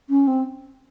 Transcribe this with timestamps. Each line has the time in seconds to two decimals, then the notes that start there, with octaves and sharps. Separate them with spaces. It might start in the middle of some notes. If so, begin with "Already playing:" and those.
0.09 C#4
0.27 C4